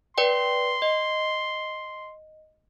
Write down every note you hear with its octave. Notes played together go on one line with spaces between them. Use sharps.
B4 D5 G5 C6
D#5